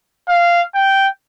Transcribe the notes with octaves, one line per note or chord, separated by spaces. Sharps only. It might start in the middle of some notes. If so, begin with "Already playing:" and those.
F5
G5